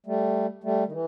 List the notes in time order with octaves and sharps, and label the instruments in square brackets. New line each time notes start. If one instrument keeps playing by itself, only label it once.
[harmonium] G3 A3
G3 A3
D#3
E3